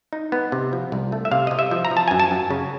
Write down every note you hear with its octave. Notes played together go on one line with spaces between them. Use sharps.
D#4
B3
C3
F3
C2
A3
E5
C3 F5
C3 D#5
E5
F3
A#5
F3
A5
F#2 G#5
A5
F#2
C#3